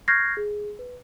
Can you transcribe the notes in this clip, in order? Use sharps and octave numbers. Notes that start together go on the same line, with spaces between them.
C#6 F6 G6 G#6 A#6 C7
G#4
B4